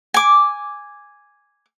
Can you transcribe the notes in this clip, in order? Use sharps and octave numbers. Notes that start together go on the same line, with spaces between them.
G#5 D6